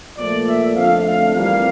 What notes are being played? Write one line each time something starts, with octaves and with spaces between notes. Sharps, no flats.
A#2 F3 A3 D5
E5
F2 D3 A3 F5
F5
F2 E3 G3 A#3 F5